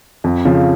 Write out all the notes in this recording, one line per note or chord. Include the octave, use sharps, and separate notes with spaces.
F2
C#3 F3